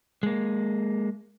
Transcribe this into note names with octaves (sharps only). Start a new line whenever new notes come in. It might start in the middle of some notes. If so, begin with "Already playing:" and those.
G#3 A#3